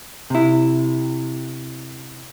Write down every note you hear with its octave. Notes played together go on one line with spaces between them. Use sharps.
C3 E4